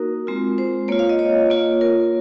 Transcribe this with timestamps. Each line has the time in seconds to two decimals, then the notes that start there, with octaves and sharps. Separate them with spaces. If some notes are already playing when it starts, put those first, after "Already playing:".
Already playing: A#3 D#4 F#4 A#4
0.27 G#3 C4 F4
0.58 C5
0.88 A#3 F4 C#5
0.99 F5
1.09 D#5
1.19 C#5
1.50 A#3 F4
1.81 A#4